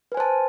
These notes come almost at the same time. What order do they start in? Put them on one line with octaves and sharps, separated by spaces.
B4 G#5 C5 A5